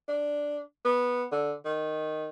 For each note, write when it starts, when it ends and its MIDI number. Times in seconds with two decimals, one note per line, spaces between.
0.08 0.60 62
0.85 1.24 59
1.32 1.53 50
1.65 2.29 51